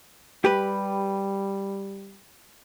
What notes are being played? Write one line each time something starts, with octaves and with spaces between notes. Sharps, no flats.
G3 G4 B4